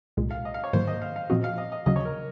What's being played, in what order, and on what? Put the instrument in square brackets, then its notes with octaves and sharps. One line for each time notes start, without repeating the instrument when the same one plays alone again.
[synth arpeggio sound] C2 A#2 G#3
[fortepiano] F5
D#5
F5
C#5
[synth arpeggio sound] G#2 D#3 F#3 A#3 [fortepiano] C5
[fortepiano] D#5
F5
F5
[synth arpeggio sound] A#2 F3 C4 F#4 [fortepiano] D#5
[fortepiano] F5
D#5
D#5
[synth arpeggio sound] D#2 C#3 F#3 [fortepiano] D#5
[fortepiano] C#5
A#4